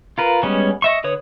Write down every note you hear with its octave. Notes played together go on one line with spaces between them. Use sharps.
F4 A#4 B4
G3 G#3 B3 C#4 C#5
D#5 E5 C#6
D3 B4 C#5 D#6